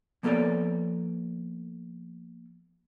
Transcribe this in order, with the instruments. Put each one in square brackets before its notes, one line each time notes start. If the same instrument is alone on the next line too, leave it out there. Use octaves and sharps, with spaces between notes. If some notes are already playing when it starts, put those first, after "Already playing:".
[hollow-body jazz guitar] F3 A#3 B3 A4 C#5 D5